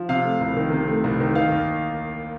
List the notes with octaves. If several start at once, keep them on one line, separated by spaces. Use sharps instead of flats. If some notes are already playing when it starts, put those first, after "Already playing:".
Already playing: F3
C3 F5
A3
C2
D#3
C3
A3
C2
D#3
D#3 F5
D#2